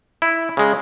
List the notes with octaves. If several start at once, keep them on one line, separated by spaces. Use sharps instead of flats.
E4
C#3 G#3